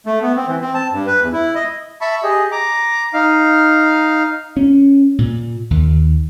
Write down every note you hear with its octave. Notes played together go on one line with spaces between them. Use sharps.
A3
B3
C4
E3
C4
A5
G2
B4
E2
E4
D#5
E5 A5 B5 C#6
G4 G#4 D#5
A#5 D6
D#4 F5
C#4
A#2
D#2